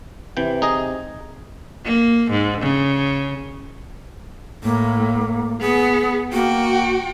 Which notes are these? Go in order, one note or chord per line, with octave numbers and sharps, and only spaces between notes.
C3 E3 G5
D#4 G#4 D#5
A#3
G#2
C#3
A2 A#3
B3 G#4
A#3 F#4 G5